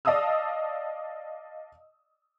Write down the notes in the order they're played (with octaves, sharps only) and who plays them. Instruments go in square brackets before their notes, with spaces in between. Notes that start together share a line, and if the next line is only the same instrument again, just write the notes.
[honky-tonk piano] D5 D#5 F5 A5 D#6 E6